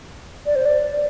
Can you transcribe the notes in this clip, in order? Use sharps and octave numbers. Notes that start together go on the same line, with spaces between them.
D5
C5
D5